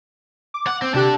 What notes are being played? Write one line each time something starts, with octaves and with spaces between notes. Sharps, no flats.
D6
F#5
C4
C3 D4 G4 A4 F#6